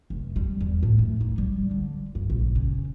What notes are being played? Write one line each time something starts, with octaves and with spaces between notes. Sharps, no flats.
F1
G3
E2
A2
A3
D#4
G3
D3
G2
A#1
C#3